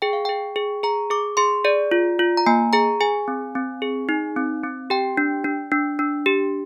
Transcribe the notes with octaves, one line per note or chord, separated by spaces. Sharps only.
G#4 G5
F5
G#4 G5
G#4
G#4 A#5
G#4 D6
G#4 C6
G#4 D5
F4
F4
A#5
A#3 G#5
G#4 A#5
G#4 G#5
C4
C4
G#4
D#4
C4
C4
G4 G5
D4
D4
D4
D4
G4